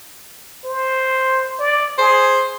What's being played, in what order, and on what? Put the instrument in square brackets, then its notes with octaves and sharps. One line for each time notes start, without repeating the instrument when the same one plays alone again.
[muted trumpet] C5
D5
[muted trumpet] G#4 [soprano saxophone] C5